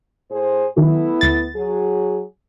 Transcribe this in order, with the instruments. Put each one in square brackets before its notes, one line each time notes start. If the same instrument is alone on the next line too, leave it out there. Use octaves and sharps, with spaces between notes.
[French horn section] A2 G#4 C5
[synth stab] D#3 F#3 [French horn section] A3 B3 E4
[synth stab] D2 A6
[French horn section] F#3 G#4